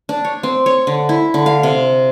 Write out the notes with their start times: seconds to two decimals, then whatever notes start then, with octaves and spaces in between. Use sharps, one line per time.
0.09 D4
0.25 C#5
0.43 C4
0.66 C#5
0.87 D3
1.09 E4
1.34 D3
1.46 F5
1.63 C3